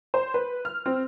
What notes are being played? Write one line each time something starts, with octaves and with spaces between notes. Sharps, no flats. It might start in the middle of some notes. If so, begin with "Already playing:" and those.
C5
B4
F6
C4